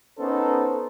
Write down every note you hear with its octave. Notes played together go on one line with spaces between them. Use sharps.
B3 C#4 D#4 A4 A#4 C5